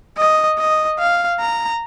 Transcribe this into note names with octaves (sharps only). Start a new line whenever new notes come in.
D#5
D#5
F5
A#5